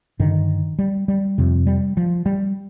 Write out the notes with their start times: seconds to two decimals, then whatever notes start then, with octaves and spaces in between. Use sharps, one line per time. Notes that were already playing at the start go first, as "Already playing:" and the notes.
0.19 G2 D3 D#3
0.79 G3
1.08 G3
1.38 F2 C3
1.67 G3
1.97 F3
2.26 G3